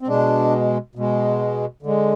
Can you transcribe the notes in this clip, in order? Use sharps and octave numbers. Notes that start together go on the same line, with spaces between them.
C4
B2 G#3 D4
B2 G#3
D3 G#3